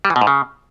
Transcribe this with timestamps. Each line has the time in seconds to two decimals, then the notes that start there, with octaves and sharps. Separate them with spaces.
0.05 G3
0.10 E3
0.16 B2
0.21 G#2
0.27 C#3